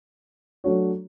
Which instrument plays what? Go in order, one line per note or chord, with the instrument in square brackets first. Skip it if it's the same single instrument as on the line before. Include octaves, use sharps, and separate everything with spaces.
[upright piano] F#3 A3 D4 F#4 C#5